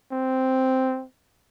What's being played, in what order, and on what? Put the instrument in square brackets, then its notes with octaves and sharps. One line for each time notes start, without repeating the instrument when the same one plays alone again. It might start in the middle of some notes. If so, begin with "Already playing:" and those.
[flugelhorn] C4